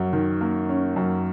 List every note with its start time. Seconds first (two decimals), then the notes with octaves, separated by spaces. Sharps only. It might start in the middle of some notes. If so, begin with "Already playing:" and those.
Already playing: F#2 C#4
0.13 D#3
0.41 A#3
0.69 C#4
0.96 F#2